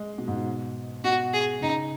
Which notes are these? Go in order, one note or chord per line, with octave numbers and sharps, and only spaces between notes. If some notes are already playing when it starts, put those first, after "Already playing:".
Already playing: G#3
B2
G#2
B2
B2 F#4
G#4
C#3 D#4